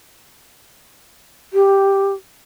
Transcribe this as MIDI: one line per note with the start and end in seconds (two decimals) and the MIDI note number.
1.53 2.12 67